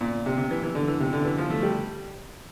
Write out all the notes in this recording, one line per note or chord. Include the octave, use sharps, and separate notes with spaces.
A#2
C3
C3
E3
E3
D3
E3
C3
D3
E3
F3
A3
G3